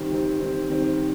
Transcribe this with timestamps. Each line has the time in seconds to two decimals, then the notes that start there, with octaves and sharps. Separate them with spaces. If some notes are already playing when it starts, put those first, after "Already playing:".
Already playing: D#3 G3 C4
0.12 D#3 G3 C4
0.40 D#3 G3 C4
0.70 D#3 G3 C4